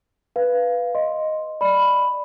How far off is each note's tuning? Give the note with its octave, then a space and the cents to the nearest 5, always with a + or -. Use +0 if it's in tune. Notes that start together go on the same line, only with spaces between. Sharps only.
B4 +0 F5 -5
D#5 +0 C6 +0
D5 +0 B5 +0